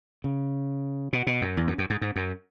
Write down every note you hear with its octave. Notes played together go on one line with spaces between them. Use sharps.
C#3
B2
B2
F#2
E2
F#2
F#2
G#2
G#2
F#2